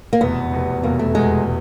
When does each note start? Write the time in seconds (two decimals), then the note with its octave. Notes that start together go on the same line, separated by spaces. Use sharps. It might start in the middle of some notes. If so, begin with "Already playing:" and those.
0.13 A#3
0.20 F1 E2 B2 B3
0.52 F1 E2 B2
0.83 F1 E2 B2 A#3
0.99 A3
1.14 F1 E2 B2 G#3